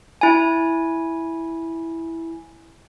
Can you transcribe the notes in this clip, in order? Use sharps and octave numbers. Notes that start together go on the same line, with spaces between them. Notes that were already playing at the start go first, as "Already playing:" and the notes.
E4 G#5